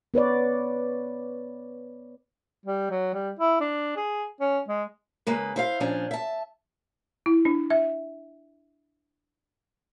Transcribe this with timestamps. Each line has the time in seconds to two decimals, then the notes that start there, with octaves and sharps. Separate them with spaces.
0.14 B3 B4 C#5 D5
2.65 G3
2.90 F#3
3.14 G3
3.39 E4
3.61 D4
3.96 G#4
4.40 C#4
4.68 G#3
5.27 C#3 G#3 A#3 B4
5.56 E4 C5 F5
5.80 A#2 F3 C#4 D4
6.11 E5 A5
7.26 E4
7.45 D4
7.70 E5